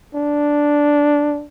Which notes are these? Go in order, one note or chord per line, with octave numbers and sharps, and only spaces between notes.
D4